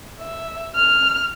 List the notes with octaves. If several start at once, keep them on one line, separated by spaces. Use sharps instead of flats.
E5
F6